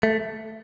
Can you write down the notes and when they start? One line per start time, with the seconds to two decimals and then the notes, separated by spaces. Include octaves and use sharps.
0.03 A3